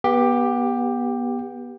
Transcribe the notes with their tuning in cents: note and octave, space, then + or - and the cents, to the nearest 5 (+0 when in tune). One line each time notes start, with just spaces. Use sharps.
B3 -25 G4 +10